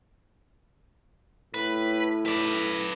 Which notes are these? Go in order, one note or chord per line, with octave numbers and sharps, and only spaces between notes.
A2 B4
B4 D5